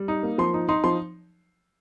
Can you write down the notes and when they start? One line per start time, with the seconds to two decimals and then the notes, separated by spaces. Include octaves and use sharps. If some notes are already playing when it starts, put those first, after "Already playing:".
Already playing: G3
0.08 D#4
0.23 A#3
0.38 F3 C6
0.54 D#4
0.69 D#4 C6
0.84 F3 C6